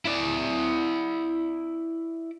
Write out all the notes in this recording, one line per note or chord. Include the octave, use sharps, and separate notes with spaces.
E4 D5